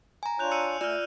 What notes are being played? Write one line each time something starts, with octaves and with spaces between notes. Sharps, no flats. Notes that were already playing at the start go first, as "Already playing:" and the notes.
G#5 A#5
D4 F4 C#5 F#6 G6 F7
G#5 E6 C#7 D#7
A3 F4 D5 E6 F6